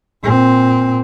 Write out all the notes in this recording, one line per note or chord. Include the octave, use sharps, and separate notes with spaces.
A#2 C4